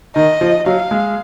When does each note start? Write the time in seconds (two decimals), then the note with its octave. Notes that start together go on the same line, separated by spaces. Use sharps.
0.16 D#3 D#5
0.41 F3
0.66 F#3 F5
0.91 G#3